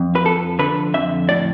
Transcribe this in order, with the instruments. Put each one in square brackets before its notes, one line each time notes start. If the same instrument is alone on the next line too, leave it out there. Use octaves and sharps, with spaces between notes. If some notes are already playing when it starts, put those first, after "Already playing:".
Already playing: [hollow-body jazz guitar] F2
B4
F3 A4
D3 B4
F2 E5
A2 D5